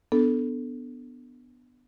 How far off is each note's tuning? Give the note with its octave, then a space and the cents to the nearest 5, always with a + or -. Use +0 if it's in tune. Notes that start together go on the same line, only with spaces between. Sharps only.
B3 +0 D4 +0 A4 +0